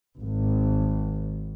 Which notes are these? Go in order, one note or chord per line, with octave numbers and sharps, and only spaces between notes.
G#1